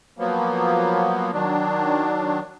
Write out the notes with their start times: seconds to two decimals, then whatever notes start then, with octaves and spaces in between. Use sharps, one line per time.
0.19 F3 F#3 A#3 B3
1.33 D#3 F#3 D4